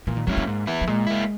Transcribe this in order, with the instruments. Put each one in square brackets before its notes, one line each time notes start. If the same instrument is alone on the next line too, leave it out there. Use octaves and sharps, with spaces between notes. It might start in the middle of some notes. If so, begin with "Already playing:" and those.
[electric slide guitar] A#2 [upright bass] E3
[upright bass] D#3
[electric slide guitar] F#3 C#4 E4 [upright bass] G#3
[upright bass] A#3
[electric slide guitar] G#2
E3 B3 E4
[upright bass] F#3
[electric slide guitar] A#2 [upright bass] G#3
[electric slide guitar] A#3 E4